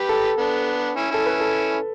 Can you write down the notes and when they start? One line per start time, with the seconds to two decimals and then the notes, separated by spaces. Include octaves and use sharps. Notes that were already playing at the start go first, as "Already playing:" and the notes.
Already playing: G4 B4
0.09 A4
0.38 B3 D4
0.96 C#4 E4
1.11 C#4 E4 A4
1.26 B4
1.41 A4